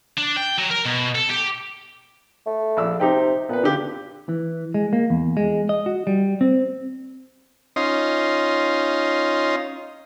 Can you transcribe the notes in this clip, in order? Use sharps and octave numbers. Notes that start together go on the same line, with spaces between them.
D4
G5
F#3
A#4
B2
A4
G4
A3
A#1 D5 E6
C3 D#4 G4 G5
A#2 B3 B4
D3 G4
E3
G#3
A#3
E2
G#3
D#5
F#4
G3
C4
C#4 D#4 F4 D#5 C6